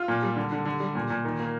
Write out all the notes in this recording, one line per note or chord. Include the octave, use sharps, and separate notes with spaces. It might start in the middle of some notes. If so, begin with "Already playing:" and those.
Already playing: F4
A#2
G3
D3
D3
D3
G3
A#2
A#2
D#3
A#3